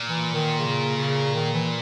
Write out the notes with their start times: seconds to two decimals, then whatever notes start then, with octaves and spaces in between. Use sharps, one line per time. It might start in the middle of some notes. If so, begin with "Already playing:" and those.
Already playing: A#2
0.09 E3
0.34 D#3
0.59 C#3
0.97 C#3
1.35 D#3
1.53 E3